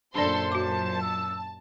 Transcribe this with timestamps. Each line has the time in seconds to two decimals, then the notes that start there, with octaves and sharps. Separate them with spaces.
0.15 F#2 A#2 D4 A4 C5 D5 C6
0.52 F#4 A5 D6
1.02 E6